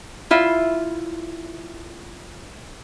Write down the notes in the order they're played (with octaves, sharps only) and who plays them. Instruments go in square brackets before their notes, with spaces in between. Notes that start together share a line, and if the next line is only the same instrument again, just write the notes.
[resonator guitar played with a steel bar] E4 F4 E5